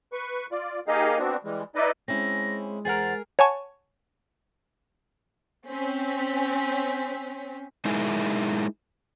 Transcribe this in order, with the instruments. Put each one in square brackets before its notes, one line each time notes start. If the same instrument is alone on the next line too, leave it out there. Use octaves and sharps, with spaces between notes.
[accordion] B4 C#6
F4 D5
A#3 D#4 G4 G#4 D#5 F5
B3 C4 D4 F#4
E3 G3 G#3
D#4 E4 B4 D5 D#5
[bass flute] G#3 [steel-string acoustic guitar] C4 C#4 E4 [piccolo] A#6
[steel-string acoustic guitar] E2 C5 F#5 [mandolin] G#4 A#4 [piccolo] A6
[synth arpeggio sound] C#5 F#5 G#5 A5 C#6
[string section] C4 C#4 B6
[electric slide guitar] G#3 D#4 E4 G#4 A#4 E5